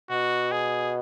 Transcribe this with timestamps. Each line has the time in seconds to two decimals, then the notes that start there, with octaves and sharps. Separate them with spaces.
0.11 B2 F#4
0.52 G#4